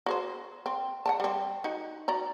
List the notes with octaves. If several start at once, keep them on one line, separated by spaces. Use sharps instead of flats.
F#4 G#4 C5
C4
F#5 G5 A5
G3 C4
D#4 F#4
F#4 D5 A#5